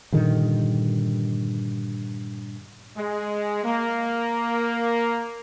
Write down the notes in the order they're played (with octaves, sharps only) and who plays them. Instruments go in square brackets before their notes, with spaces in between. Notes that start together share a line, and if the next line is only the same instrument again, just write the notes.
[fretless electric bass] G2 A#2 D3 D#3
[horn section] G#3
A#3